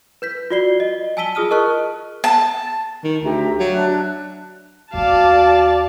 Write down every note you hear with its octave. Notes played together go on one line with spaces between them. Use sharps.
B4 G6 B6
F4 F#4 D5 C7 G7
D#5
G#5 A5 E6 B6 D#7 G7
F4 G#4 D#6 F6 D#7
A#4 D#5 A5 C#6 F6 F#6
A5
D#3
D2 G4 E5 A#5
F#3 F5
D4 E5 F#6
D#2 B3 F#4 D5 F5 A5